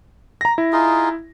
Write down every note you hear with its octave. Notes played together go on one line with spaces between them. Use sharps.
A#5 A#6
E4
D#4 F4 G#4